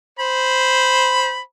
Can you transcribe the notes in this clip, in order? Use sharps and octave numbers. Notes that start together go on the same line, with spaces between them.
C5 B5